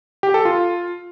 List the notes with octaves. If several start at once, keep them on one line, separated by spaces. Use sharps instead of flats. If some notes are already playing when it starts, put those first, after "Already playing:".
G4
A4
F4